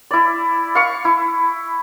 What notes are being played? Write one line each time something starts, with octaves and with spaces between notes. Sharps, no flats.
E4 D5
F5 C#6
E4